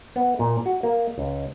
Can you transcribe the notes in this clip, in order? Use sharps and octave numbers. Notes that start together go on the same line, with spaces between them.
B3
A#2
F#4
A#3
C#2